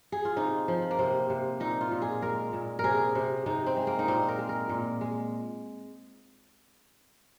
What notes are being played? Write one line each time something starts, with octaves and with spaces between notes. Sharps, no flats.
G#4
F4
C3 D#4
F3
A#3
C3 C4
C3
A#2 D#4
F4
A#2
G#4
G#3 A#4
A#2
A#4
C3 G#4
C3
C3 D#4
C4
G#3
A#3
D#4
A#2 C4
A#4
G#3
A#4
A#2
G#3